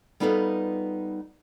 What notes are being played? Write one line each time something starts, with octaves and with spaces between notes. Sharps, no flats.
G3 B3 D#4 F4 A4 B4